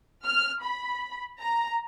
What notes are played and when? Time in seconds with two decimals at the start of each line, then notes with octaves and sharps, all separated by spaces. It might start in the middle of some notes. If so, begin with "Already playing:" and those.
0.26 F6
0.63 B5
1.40 A#5